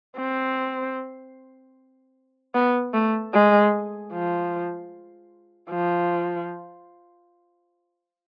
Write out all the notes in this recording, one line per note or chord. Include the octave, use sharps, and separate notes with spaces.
C4
B3
A3
G#3
F3
F3